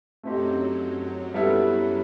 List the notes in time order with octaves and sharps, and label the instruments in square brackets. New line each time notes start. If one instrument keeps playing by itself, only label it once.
[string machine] F#2 F#3 [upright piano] A3 C4 D#4 G4
[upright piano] G3 B3 E4 A4